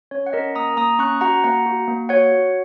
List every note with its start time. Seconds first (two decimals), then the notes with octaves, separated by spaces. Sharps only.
0.11 C#4 C#5
0.26 F#5
0.33 C#4 A#4 D#5
0.55 A#3 A#5 D#6
0.77 A#3 A#5 D#6
0.99 C#4 C#6 F#6
1.21 F#4 F#5 A#5
1.44 A#3 F#5 A#5
1.66 F#4
1.88 A#3
2.09 F#4 C#5 F#5
2.32 F#4